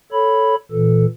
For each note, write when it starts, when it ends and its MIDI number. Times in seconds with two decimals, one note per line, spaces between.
0.12 0.55 69
0.12 0.55 73
0.12 0.55 83
0.72 1.06 46
0.72 1.06 52
0.72 1.06 69